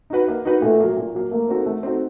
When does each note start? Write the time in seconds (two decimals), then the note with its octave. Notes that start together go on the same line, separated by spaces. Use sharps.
0.10 D#4 F#4 B4
0.28 A#3
0.45 D#4 F#4 B4
0.62 A#2 A3
0.80 F#3 A#3
0.97 A#2
1.15 F#3 A#3
1.31 A3 A#3
1.49 C4 D#4 F#4 A4
1.66 A3
1.83 C4 D#4 F#4 A4